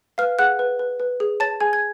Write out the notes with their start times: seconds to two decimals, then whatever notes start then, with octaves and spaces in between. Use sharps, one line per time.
0.18 B4 F5 F6
0.39 G#4 F#5 F#6
0.59 B4
0.79 B4
1.00 B4
1.20 G#4
1.40 C#5 A5 A6
1.60 G#4 G#5 G#6
1.73 G#6